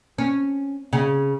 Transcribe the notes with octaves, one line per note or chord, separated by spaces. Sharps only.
C#4
C#3